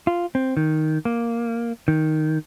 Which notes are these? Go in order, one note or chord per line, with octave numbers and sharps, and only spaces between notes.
F4
C4
D#3
A#3
D#3